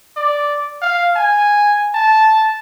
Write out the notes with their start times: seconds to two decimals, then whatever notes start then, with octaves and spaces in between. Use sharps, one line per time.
0.16 D5
0.82 F5
1.16 G#5
1.95 A5